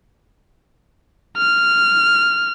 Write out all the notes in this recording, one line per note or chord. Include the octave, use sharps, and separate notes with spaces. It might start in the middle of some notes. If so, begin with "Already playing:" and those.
F6